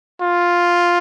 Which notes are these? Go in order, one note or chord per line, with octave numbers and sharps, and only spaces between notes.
F4